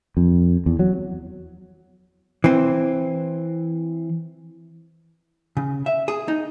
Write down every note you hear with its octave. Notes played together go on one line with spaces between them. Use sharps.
F2
E2
F#3
E3 C4
C#3
E5
G#4
D#4